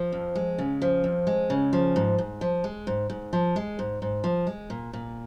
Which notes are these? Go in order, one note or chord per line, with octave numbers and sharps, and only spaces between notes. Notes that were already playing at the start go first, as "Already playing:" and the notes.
Already playing: F3
F2
G#3
C#3
F3
F2
G#3
C#3
F3
G#2
G#2
F3
G#3
G#2
G#2
F3
G#3
G#2
G#2
F3
G#3
A#2
A#2